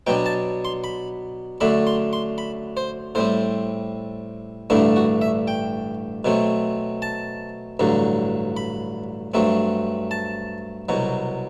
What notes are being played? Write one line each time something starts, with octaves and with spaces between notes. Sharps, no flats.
B2 F#3 B3 D4 G5
A5
C6
B5
F#2 D3 A3 D4 B5
C6
C6
B5
C5
A2 G3 C4 C5
A1 G2 D3 A3 D4 E4
F#4
E5
G5
B2 F#3 A3 C4
A5
A1 G2 D3 F#3
B5
G2 F#3 A3 C4
A5
C2 B2 F#3